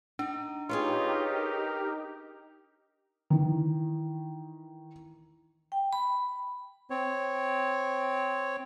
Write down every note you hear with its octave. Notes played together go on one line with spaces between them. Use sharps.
D4 D#4
D#4 F4 G4 G#4 B4 C#5
A#4
D#3 E3
G5
B5
C4 C#5